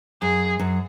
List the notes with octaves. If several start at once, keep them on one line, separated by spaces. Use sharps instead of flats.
F#2 G#4
F#2